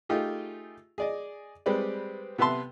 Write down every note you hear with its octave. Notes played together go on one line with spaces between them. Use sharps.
A3 D#4 F4 G4 G#4
G#4 D5 D#5
G3 G#3 C4 B4 D5
C3 B3 B4 E5 A5 C6